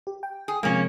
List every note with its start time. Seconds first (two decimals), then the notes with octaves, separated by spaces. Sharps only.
0.07 G4
0.23 G5
0.48 G#4
0.63 C3 F3 G#3 A#3 C#4